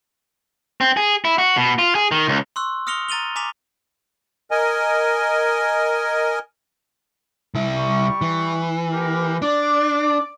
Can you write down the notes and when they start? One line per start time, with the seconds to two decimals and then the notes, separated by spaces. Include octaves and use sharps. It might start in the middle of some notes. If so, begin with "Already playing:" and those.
0.81 C4
0.97 G#4
1.25 E4
1.38 F#4
1.57 B2
1.79 F4
1.95 G#4
2.11 D#3
2.28 C#2
2.56 C6 C#6 E6 F#6
2.87 D#6 F6 A#6 C#7 F7 G7
3.08 A#5 A6 D#7 F7 G7
3.35 G#5 A#5 D6 B6 F7
4.51 A#4 D#5 G#5
7.54 C2 E4
7.77 G3 C#6
8.21 E3
8.92 A#3 G4 A#4
9.42 D4 D5 D6